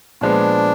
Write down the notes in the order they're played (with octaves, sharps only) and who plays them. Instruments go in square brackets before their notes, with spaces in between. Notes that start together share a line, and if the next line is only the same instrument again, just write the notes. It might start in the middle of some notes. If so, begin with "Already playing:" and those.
[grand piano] A#2 F3 G#3 B3 [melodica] D4